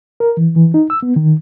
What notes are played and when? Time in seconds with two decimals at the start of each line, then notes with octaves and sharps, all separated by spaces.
0.20 A#4
0.37 E3
0.56 E3
0.74 D#4
0.90 E6
1.03 B3
1.16 D#3